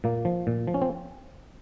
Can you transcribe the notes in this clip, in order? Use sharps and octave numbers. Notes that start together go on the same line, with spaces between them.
A#2 A#3
F3
A#2
F3
C#4
C4